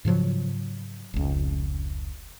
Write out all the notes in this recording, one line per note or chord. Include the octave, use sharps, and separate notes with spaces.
G#2 C#3 F3 F#3
F1 C#2